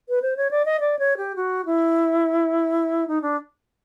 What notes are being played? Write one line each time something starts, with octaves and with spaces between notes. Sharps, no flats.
B4
C5
C#5
D5
D#5
D5
C#5
G4
F#4
E4
D#4
D4